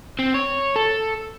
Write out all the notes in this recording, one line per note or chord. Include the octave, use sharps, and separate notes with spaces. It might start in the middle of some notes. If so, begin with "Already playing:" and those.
C4
C#5
A4